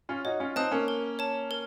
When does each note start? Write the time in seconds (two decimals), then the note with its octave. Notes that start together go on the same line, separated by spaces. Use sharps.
0.09 C#4 F4
0.25 D#4 F#4 C#5
0.40 C#4 F4
0.56 C4 D#4 A5 D#6 F#6
0.71 A#3 C#4
0.88 A#4
1.19 C#5 A5
1.51 A#4